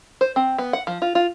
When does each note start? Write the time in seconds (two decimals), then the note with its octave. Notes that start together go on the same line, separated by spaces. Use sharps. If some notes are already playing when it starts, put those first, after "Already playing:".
0.21 C5
0.36 C4
0.58 B3
0.73 F#5
0.87 F3
1.02 F4
1.15 F4